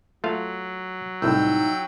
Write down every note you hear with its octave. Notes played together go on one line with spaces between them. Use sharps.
F#3 A3 F4 F5
C2 A2 D#4 E4 G5 E6